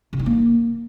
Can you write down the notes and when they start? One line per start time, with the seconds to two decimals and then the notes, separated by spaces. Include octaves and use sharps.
0.13 C#3
0.19 D#4
0.26 A#3